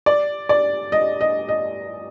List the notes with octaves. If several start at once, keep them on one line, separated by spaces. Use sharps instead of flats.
D5
D5
D#5
D#5
D#5